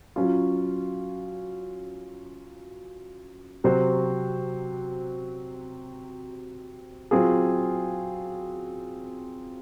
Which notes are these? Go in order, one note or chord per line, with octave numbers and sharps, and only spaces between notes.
F#3 C#4 F4
C3 F#3 C4 F#4 C5
F#3 C4 F4 G#4